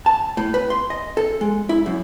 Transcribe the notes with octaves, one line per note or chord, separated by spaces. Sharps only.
A5
A2
B4
C6
D#5
A4
G#3
E4
F#2